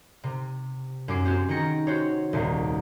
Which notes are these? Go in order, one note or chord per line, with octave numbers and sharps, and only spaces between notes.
C3
F#2 C#4 D6 C7
C4 C#4 F#4 G4
D#3 G#4 G5 A#6 C#7
F#4 C5 C#5
D#1 C2